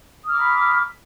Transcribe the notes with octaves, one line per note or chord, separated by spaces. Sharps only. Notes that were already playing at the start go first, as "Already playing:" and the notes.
A#5 B5 D6 D#6 F6